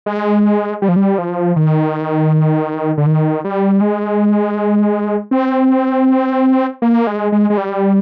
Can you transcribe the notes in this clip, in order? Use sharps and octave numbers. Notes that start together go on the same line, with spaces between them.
G#3
G3
F3
G3
F3
D#3
D3
D#3
G3
G#3
C4
A#3
G#3
G#3
G#3
G3